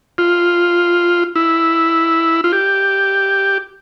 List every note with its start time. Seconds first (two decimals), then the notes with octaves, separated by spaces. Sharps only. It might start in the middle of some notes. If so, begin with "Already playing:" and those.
0.18 F4
1.36 E4
2.44 F4
2.52 G4